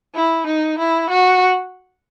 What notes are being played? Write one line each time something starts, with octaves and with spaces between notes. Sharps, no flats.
E4
D#4
E4
F#4